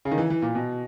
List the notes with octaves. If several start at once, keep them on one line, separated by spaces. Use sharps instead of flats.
C#3
D#3
E3
E3
A#2
B2